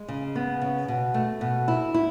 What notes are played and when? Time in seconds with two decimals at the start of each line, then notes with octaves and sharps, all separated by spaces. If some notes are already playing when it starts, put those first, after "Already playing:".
Already playing: G#3
0.08 C#3
0.36 B3
0.62 C#3
0.88 B2
1.14 A3
1.41 B2
1.68 E4
1.94 E4